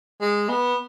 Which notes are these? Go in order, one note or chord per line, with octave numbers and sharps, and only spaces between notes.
G#3
B3